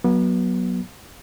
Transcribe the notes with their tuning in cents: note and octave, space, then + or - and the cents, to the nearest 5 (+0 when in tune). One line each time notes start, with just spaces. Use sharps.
F#3 +0 B3 -30